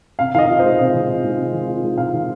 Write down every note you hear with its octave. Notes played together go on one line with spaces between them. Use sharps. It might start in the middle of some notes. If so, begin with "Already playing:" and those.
C3 F5
D#3 D#5 F5
F4
G#3 C5
C3 D#5
D#3
F4
G#3
C3
D#3
F4
G#3
C3 F5
D#3